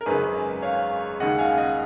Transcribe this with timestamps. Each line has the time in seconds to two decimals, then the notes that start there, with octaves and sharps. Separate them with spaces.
0.01 A#4
0.06 G#1 F#2 C#3 G#3 G#4 B4
0.62 C#5 F5
1.20 D#2 C#3 G#3 D#5 F#5
1.38 F5 G#5
1.57 D#5 F#5